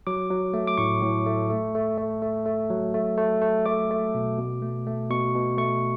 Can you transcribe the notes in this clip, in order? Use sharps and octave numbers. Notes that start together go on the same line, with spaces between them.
F#3 D6
F#3
A3
D6
A2 C#6
A2
A3
A3
A3
A3
A3
A3
F#3
A3
A3
A3
A3 D6
A3
B2
B2
A3
A3
B2 C#6
B2
A3 C#6